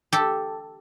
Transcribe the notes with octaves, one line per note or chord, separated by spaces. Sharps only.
G4 A4